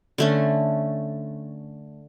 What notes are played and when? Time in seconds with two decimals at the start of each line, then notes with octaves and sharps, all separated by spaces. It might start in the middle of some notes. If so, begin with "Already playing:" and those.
0.18 D3 A3 C#4